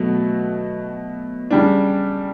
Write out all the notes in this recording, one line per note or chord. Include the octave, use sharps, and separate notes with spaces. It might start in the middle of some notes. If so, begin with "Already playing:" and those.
Already playing: B2 F#3 A3
C#3 G3 D4